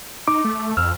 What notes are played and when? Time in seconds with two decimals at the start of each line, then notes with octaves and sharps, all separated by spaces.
0.28 D#4 D6
0.44 A3
0.77 F2 E6 F6